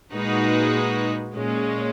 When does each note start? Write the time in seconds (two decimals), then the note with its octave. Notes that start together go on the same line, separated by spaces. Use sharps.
0.11 A#2 G#3 D#4 F#4 B4
1.34 A#2 G#3 C#4